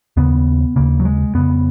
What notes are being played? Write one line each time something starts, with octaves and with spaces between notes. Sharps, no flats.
D#2 C#3 B3
D#2 C#3 A#3
F#3
G#3
F2 C#3 B3